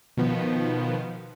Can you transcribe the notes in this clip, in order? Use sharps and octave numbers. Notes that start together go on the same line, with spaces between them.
B2 D#3 F3 B3